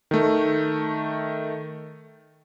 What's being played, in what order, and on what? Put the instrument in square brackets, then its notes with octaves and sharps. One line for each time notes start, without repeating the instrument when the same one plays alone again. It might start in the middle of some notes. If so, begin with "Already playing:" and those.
[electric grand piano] D#3 A3